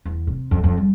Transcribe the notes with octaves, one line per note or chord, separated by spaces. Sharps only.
E2
C3
F2
F2
G3